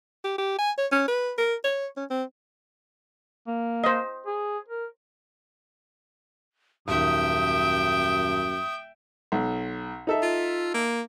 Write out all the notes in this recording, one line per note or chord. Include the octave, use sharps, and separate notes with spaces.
G4
G4
G#5
C#5
C#4
B4
A#4
C#5
C#4
C4
A#3
C5 D#5
G#4
A#4
D#1 F#2 D#3 E5 G5 D#6
B1
D#4 A4 E5
F4
A#3